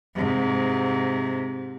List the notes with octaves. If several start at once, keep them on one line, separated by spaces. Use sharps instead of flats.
G#2 C3